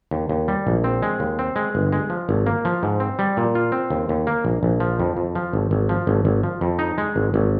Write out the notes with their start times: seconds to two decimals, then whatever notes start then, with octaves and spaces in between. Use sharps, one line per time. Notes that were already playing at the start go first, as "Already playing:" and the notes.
0.11 D#2
0.29 D#2
0.48 G3
0.67 A#1
0.84 C4
1.03 G#3
1.20 D#2
1.39 C4
1.56 G#3
1.75 G1
1.92 G#3
2.10 F3
2.29 G#1
2.46 A#3
2.65 F3
2.83 G#2
3.00 C4
3.19 G3
3.37 A#2
3.55 F4
3.72 C4
3.90 D#2
4.09 D#2
4.27 A#3
4.45 A#1
4.63 A#1
4.80 F3
4.99 F2
5.17 F2
5.35 F3
5.53 G#1
5.71 G#1
5.89 F3
6.07 G#1
6.25 G#1
6.43 F3
6.61 F2
6.79 D#4
6.98 G#3
7.16 G#1
7.34 G#1